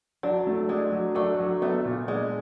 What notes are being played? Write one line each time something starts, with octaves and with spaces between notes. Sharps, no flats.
F#3 D4
A3
G#3 D4
F#3
A3 D4
F#3
A3 B3
A#2
G#3 D4